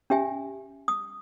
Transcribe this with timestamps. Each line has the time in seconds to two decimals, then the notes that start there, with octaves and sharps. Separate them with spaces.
0.10 C#4 G4 E5 G#5
0.88 D#6